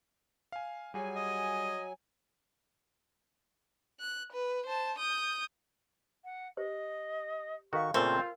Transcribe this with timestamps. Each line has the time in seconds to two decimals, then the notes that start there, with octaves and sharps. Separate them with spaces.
0.52 F5 G#5
0.94 F#3 G3 F#4 G#4 G#5
1.16 D#5
4.00 F#6
4.32 B4
4.66 C5 A5
4.98 D#6 G6
6.24 F#5
6.57 G4 C5 D#5
7.73 D#3 F#4 A4 F5 C#6
7.94 A#2 C#3 A3 C4 F4 A#4 G5 G#5